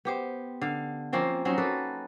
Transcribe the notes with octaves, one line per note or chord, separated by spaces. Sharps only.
B3 G4 C5
D3 F5
F3 A#3 C4 C#4
F#3 C4 C#4 D#4
A#3 A4 B4